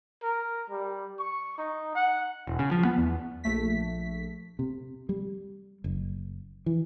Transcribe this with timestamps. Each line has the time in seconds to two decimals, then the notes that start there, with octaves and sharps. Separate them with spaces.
0.23 A#4
0.70 G3
1.19 C#6
1.58 D#4
1.95 F#5
2.47 E1
2.59 C#3
2.71 F3
2.85 B3
2.98 E2
3.44 A#1 A3 B6
4.59 C3
5.09 G3
5.84 F#1
6.66 E3